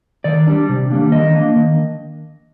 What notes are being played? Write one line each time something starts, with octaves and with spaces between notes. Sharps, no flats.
D#3 D5
G3 D4
C3
D#3 G3 A#3 D4
D#3 D#5
A#3 D4
D#3